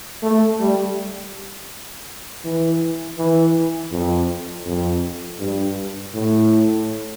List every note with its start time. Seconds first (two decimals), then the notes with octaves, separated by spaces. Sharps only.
0.23 A3
0.60 G3
2.44 E3
3.18 E3
3.92 F2
4.66 F2
5.39 G2
6.14 A2